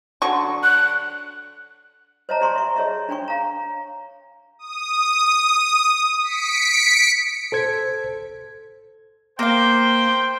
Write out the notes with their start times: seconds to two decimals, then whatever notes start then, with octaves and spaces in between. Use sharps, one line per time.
0.22 D3 F#3 C#6
0.63 F#6
2.29 C5 C#5 D#5 E5 A5 A#5
2.41 G4 D5 G#5 A#5 C6 C#6
2.56 E5 C#6
2.76 G#4 C#5 D#5 E5
3.09 D4 C#5 G5 G#5 C#6
3.28 F5 A#5
4.59 D#6
6.21 B6 C#7 D7
7.52 A4 C5 G#6
9.39 A#3 C5 F5 G5